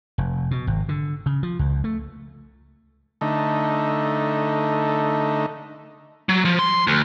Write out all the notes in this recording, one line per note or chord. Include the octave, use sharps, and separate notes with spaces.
F1
B2
G#1
D3
C#3
F3
C#2
A3
D3 A3 D#4
F#3
F3
C6
D2